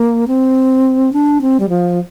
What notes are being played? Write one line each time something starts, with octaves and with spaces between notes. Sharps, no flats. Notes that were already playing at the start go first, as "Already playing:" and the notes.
Already playing: A#3
C4
D4
C4
G3
F3